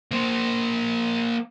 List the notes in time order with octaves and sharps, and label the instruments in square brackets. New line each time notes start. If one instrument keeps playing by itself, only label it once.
[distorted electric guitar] A#3 C5